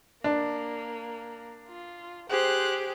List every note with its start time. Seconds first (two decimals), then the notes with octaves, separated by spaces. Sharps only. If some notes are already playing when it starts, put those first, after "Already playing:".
0.24 A#3 D4
1.68 F4
2.30 G4 G#4 C5 F#6